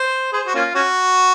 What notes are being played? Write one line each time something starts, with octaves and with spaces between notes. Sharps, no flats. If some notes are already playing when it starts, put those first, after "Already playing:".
Already playing: C5
G#4 C5
F#4
A#3 C#4 F4
C#4 F#4